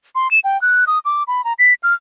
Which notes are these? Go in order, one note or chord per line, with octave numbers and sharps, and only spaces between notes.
C6
E7
G5
F#6
D#6
D6
B5
A#5
B6
F6